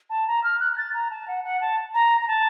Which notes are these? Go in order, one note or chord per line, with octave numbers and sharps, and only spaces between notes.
A5
A#5
F6
F#6
F#6
A6
A#5
A5
F#5
F#5
A5
A#5
A#5
A5